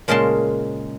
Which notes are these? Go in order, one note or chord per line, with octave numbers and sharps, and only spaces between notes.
A#2 C#3 G#3 A#3 A5 C6